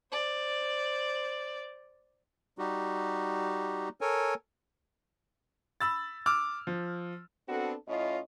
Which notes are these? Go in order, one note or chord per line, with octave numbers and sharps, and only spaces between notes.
C5 D5
G3 D#4 F#4 G4
A4 A#4 C#5 G#5
B5 E6 A6
D6 E6 F6
F3
B3 C4 D4 F#4 A4
A2 C#4 F4 D#5